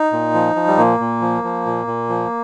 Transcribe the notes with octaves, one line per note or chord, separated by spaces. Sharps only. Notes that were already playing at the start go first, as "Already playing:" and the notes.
Already playing: D#4
A#2
F3
F3
G3
A#2 A#3
A#2
F3
F3
A#2
A#2
F3